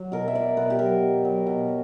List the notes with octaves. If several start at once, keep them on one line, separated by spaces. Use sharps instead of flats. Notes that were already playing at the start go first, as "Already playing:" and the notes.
Already playing: F#3
B2 A#4
E5
F#3 D5
B2 B4
G4
F#3 A#4
B2
F#3
B2
F#3